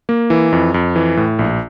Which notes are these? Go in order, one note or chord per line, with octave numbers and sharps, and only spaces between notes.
A#3
E3
F2
F2
E3
A2
A#1